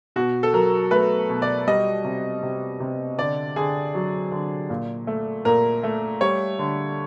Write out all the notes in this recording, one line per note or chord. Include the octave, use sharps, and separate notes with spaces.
B2 F#4
A4
F#3 A#4
A3 B4
B2
D5
G3 D#5
C3
C3
C3
D3 D5
D3 G#4
F#3
D3
A#2
A3
A#2 A#4
A3
G3 C#5
D3